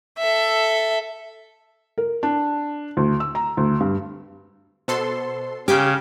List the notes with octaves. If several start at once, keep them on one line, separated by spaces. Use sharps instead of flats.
A4 E5
A#4
D4
D2
E6
A#5
D2
G2
B2 A4 C5 C6
C#3 G4 G#5 D6 F6 G6